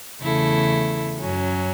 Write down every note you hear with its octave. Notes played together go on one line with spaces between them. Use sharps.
E2 C#3 A3 E4 A4
F#2 F#3 C#4